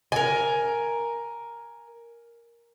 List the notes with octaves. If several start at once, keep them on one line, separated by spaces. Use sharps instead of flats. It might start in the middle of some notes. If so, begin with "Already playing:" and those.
A#4 G#5